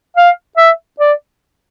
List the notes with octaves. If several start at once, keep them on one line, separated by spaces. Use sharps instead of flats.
F5
E5
D5